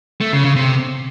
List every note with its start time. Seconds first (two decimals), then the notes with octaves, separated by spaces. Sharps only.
0.21 A3
0.33 C#3
0.44 C#3
0.56 C3